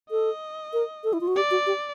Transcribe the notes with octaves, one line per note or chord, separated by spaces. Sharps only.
A4 D#5
A#4
A4
E4
F4
F#4
G4 D5
F#4
G4